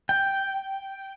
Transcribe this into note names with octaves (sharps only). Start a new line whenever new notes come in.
G5